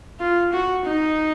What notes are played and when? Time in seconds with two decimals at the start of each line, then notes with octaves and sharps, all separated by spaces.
0.20 F4
0.52 F#4
0.85 D#4